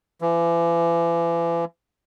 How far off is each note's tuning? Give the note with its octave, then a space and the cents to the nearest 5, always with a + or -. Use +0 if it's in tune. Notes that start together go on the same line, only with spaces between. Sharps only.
E3 +40